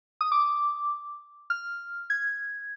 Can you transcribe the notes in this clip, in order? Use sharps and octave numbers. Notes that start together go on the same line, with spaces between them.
D#6
D6
F6
G#6